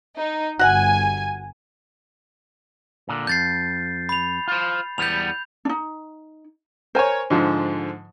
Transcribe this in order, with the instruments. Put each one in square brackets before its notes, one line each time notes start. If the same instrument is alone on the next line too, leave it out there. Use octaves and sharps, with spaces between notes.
[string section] D#4
[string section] G1 G#5 [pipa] F#4 F#5
[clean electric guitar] A#2 D3
[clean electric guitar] F2 [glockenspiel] G6 A6 C7
[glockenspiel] B5 F7
[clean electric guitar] F4 C5
[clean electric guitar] E2 G3 B3 [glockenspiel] G6 F7
[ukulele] D4 D#4
[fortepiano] A#4 C#5 [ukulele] C5 G#5
[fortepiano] G#2 D3 F3